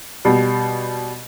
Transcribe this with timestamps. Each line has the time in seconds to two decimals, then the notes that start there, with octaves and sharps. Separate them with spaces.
0.25 B2 G3